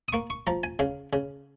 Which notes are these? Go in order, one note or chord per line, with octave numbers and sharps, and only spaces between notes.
D#6
A#3 C#6
C#6
F3 A#5
G#5
C#3 F5
C#3